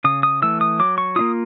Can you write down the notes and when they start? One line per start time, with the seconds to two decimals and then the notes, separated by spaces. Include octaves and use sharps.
0.04 C#3 D#6
0.23 D#6
0.42 E3 A3 E6
0.61 D#6
0.79 F#3 D6
0.98 C#6
1.16 A#3 D4 F4 D#6